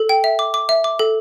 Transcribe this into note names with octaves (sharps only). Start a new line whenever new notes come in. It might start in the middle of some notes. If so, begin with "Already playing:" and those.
Already playing: A4
G5
E5
D6
D6
E5
D6
A4